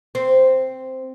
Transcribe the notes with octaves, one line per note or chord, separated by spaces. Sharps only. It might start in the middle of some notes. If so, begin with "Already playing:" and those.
C4